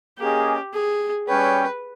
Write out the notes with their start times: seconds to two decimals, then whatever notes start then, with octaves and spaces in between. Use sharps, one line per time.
0.19 A#3 C#4 G4 G#4 D#5
0.74 G#4
1.28 G3 C#4 G#4 B4 C#5 G5